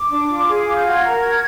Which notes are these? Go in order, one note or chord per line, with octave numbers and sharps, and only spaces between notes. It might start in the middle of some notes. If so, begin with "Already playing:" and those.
Already playing: D6
D4
F4
G#4
F4
G6
F#4 G#6
A#4
F#4